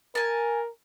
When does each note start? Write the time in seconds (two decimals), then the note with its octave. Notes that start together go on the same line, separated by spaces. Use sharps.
0.15 A#4 G#5 A5